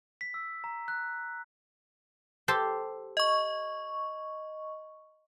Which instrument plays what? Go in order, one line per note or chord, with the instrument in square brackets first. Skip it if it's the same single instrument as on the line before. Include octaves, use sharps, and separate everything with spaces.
[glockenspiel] B6
E6
A#5
F#6
[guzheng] G4 A4 C5
[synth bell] D#5 C#6